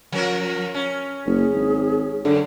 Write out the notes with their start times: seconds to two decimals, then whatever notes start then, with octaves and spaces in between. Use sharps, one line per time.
0.12 F3 C#4 A#4
0.74 C#4
1.26 F#1 G#4
1.54 G#1
2.25 F#2 D3